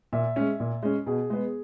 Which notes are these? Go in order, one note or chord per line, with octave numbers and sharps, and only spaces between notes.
A#2 E5
G#3 C#4
A#2
G#3 C#4
B2 G#4
G#3 B3